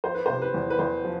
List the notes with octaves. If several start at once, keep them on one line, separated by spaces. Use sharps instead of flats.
F3 C5
B4
C5
C3
B4
E2
B4
E2 C5
F3